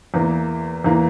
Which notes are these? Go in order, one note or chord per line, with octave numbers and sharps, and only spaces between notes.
E2 E3 A#3
E2 E3 A#3